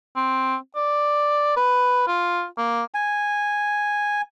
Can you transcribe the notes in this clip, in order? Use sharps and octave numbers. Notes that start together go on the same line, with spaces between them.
C4
D5
B4
F4
A#3
G#5